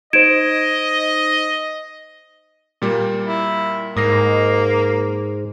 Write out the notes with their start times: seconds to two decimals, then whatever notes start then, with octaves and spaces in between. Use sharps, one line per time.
0.13 D#4 C5 D#5 G#6 D7 E7
2.82 A#2 G3 A#3
3.23 E4
3.97 G#2 A#3 D#6 A#6 C7